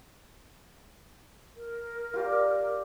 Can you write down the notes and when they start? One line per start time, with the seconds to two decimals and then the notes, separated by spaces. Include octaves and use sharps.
1.56 A#4
2.14 F4 G4 D5